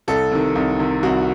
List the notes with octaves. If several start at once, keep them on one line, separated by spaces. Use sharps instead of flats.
C2 A4
C3 D#3
C2
C3 D#3
C2 F#4